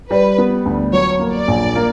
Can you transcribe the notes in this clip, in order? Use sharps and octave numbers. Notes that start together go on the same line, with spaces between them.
G3 B4
B3
D2
F#3 C#5
A#3
D5
A#1
A#3